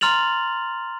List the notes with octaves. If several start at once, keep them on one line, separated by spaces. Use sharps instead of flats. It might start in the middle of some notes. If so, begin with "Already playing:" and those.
A#5 C6 F6 A6 F7 F#7